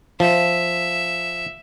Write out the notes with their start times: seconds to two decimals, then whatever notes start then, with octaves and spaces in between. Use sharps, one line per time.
0.20 F3 E5